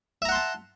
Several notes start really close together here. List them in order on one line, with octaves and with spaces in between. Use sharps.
E5 A#5 F#5 C6 A5